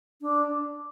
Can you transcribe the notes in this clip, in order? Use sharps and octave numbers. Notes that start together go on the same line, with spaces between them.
D4